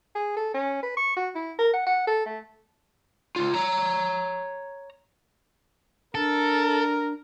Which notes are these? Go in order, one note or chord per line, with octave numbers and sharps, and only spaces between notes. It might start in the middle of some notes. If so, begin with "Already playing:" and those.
G#4
A4
C#4
B4
C#6
F#4
E4
A#4
F#5
F#5
A4
A3
C#2 F4
C#5 A#5
D4 A4 A#4